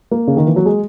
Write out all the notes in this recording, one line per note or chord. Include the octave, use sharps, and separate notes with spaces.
A#3
C#3
D#3
E3
F#3
G#3